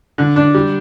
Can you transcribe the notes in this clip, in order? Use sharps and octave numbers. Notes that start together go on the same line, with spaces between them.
D3
D4
G3